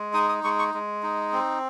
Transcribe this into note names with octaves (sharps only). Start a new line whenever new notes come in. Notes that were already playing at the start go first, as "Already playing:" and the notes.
Already playing: G#3
D#4 D#6
D#6
G#3 C#6
C#6
G#3
D#4
C4